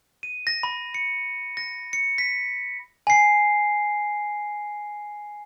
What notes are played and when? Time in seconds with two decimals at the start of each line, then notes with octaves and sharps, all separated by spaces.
0.23 D#7
0.47 A#6
0.63 B5
0.94 C#7
1.57 A#6
1.93 C#7
2.18 B6
3.07 G#5 C7